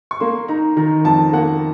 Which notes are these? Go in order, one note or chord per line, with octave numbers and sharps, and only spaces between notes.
C#6
A#3 C6
D#4 A#5
D#3 A#5
F2 A5
A#3 F#5